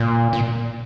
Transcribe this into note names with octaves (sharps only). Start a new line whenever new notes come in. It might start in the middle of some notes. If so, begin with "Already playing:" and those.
Already playing: A#2
A#2